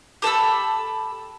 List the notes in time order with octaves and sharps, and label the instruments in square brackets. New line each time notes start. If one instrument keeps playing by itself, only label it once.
[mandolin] G4 A4 B5 E6